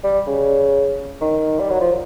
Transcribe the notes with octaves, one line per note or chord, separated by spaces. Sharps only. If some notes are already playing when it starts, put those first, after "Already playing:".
G3
C#3
D#3
G3
F#3
F3